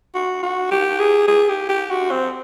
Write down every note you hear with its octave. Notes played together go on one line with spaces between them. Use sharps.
F#4
F#4
G4
G#4
G#4
G4
G4
F#4
C4